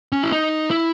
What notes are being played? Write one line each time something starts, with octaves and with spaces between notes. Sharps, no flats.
C#4
E4
D#4
E4